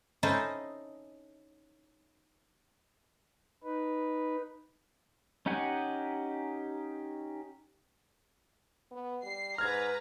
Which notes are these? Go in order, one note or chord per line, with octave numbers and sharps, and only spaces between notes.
C#4 D#4 E4 A4 C5 D#5
D#4 B4
C#4 D#4 G4 F#5 G#5
B3
G3 C7
G#2 B4 A#5 F6 G#6